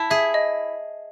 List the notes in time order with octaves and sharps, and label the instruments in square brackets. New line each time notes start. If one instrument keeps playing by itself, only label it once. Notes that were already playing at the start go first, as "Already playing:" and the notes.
Already playing: [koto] E4 [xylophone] A5
[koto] G#4 [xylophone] E5
[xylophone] D#5